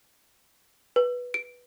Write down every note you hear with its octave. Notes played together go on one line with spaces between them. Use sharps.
B4
D7